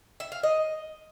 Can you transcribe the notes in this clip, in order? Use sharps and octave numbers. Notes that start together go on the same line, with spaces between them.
E5
F5
D#5